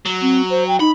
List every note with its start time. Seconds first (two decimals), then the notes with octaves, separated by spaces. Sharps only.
0.05 F#3
0.21 C4
0.50 C5
0.67 G5
0.80 D#4 B5